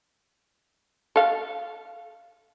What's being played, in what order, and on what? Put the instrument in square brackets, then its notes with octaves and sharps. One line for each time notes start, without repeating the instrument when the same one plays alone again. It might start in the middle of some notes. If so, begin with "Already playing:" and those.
[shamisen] A4 F5